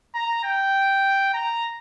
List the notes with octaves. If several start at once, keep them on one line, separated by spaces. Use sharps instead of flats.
A#5
G5
A#5